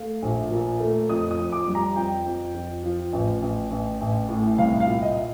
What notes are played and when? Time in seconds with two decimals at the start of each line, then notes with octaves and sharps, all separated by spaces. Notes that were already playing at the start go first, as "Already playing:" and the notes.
Already playing: A3 F5
0.23 A#1
0.51 A#2
0.80 A3
1.09 F2 D#6
1.31 D#6
1.39 F2
1.52 D6
1.67 G3
1.75 A#5
1.96 F2 G5
2.26 F2
2.54 F2
2.83 F3
3.13 A1
3.42 A1
3.71 A1
4.00 A1
4.29 A2
4.58 C2 F5
4.80 F5
4.87 A#2
5.02 D#5